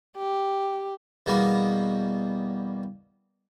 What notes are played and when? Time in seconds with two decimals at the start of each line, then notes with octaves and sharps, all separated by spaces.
0.17 G4
1.26 E2 B2 G3 A#3